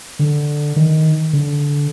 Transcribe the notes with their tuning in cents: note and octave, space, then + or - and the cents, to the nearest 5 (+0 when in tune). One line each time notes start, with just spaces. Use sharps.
D3 +5
D#3 +15
D3 -20